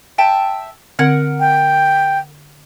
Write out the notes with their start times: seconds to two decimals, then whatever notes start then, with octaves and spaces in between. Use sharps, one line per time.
0.18 E5 G5 A5
0.99 D3 C4 A#4 F#5 G#6
1.40 G5